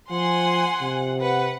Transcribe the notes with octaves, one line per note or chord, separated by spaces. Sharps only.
F3 F#5 G#5 C6
C3
B4 F#5